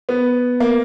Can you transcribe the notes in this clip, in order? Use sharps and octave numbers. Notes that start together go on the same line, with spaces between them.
B3
A#3